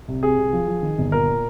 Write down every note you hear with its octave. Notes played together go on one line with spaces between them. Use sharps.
C2
C3 G#4
C2
F3
F3
D#3
G1
A#2 A#4